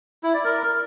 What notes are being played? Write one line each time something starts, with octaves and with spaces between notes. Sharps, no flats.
E4
D5
A#4